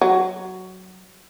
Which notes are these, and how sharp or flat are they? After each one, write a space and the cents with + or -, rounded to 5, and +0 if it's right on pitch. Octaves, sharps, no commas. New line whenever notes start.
F#3 +10